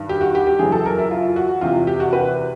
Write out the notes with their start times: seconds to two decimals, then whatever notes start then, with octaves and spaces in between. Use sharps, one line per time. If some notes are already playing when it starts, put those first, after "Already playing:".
Already playing: G2 D#3
0.09 G4
0.21 F#4
0.35 G4
0.47 G4
0.59 F#2 C#3 E3 G#4
0.72 A4
0.86 A#4
0.99 E4
1.11 F4
1.36 F#4
1.61 E2 C3 E3 F4
1.87 G4
2.00 F#4
2.13 B4